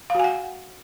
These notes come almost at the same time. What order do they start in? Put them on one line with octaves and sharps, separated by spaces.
F5 F#4 G#5 F#5